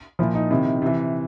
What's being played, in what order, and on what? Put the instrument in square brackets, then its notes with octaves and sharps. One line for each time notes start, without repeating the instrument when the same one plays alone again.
[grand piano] A#2 F3 E4
D#4
C3 D#3 E4
C3 E3